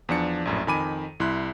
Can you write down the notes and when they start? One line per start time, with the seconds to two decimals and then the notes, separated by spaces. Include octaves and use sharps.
0.09 E2 F3 D4 C#7
0.45 A#1 F#2 A2
0.67 F2 D#3 G#5 B5 D6 D#7
1.20 C2 E4 C6 F#6